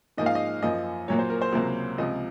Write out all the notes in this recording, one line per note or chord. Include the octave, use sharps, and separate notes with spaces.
G#2 F3 A#3 D#5
F5
D#5
F#2 F3 A#3 D#5
A#2 F#3 A#3 C#5
C5
A#4
C5
C#2 C3 F#3 A#3
C#2 C3 F3 D#5